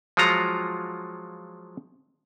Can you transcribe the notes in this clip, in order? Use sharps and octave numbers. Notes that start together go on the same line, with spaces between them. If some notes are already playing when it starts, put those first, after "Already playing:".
F3 F#3 G#3 F4 F#4 A#5